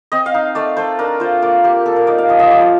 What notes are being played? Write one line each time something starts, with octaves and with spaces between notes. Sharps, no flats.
C4 D#5
F5
D#4
A3 D5
A3 C5
D4 A#4
F4 C5
A#3 D5
A#3 G4
A#3 A4
A#4
D#4 D5
F5
F3 D#5
D#5
F3 D5
C5